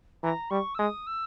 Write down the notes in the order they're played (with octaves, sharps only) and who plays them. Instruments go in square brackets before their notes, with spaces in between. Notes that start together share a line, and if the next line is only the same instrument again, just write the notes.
[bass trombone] E3 [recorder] A#5
[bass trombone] G3 [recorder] C#6
[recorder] E6
[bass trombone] G#3 [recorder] D#6
[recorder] E6